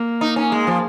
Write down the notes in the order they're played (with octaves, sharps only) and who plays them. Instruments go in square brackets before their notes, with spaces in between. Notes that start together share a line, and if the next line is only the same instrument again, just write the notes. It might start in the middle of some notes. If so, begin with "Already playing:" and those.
Already playing: [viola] A#3
[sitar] D#4
C#4
G#3
F3